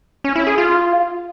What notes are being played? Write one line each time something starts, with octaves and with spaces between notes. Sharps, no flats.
C#4
E4
G#4
F4